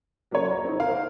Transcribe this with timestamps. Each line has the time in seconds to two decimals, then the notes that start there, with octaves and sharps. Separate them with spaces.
0.31 F#3 A#3 C#4 G#4 C#5
0.51 A#5
0.65 C4 D#4
0.80 A#4 C5 F5